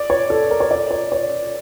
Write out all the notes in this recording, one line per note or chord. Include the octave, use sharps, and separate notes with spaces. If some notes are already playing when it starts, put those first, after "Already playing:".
Already playing: D5
C#5
A4
A#4
C#5
D5
C#5
C#5